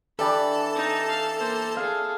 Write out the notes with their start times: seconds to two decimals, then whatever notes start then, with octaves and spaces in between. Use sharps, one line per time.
0.19 E3 D4 G4 A4 A5 B5
0.75 D#4
1.09 F5
1.38 A#3 C5
1.77 G#4 A4 F5